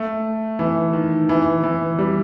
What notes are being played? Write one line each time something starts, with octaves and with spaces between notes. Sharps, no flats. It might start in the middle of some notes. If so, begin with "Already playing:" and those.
Already playing: A3
E3
D#3
E3
E3
G3